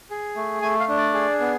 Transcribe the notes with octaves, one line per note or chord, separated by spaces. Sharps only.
G#4
A3
A3 G#5
F5
D4
D5
G#4
B3